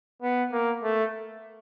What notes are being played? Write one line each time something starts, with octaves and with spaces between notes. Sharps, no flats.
B3
A#3
A3